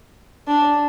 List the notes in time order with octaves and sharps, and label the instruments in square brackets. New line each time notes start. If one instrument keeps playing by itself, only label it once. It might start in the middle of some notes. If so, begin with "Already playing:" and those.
[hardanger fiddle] D4